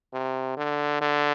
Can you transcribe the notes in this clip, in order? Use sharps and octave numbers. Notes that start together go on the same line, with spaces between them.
C3
D3
D3